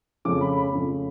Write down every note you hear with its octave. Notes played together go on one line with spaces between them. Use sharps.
F2 C#3 F3 A3 C#4 D6
B5
B5
F2 C#3 F3 A3 C#4